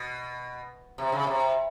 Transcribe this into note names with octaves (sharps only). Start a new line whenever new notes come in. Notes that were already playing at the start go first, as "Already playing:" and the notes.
Already playing: B2
C3
C#3
C3